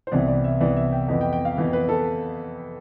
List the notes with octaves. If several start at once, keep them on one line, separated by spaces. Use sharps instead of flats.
C5
C2 C3 E3 B3 D5
D5
E5
C2 C3 E3 B3 D5
E5
G5
F2 E3 B3
G5
G5
F5
F2 E3 B3
B4
A4